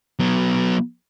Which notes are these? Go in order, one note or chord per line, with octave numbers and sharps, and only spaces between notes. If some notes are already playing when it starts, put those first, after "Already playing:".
F#3 B3